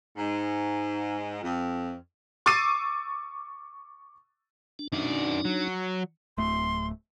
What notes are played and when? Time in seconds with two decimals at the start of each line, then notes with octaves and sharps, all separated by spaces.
0.16 G#2
1.41 F2
2.46 C#6 D6 E6 A6 C7 D#7
4.79 D4
4.93 F#2 D4 D#4 D5
5.45 F#3
6.38 D1 A3 C6